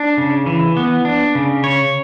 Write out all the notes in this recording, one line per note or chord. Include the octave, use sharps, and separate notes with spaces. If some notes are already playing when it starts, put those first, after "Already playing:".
Already playing: D4
C#3
E3
B3
D4
C#3
C#5